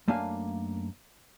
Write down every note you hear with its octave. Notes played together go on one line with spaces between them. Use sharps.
F#2 A3 A#3 D4 F5 G#5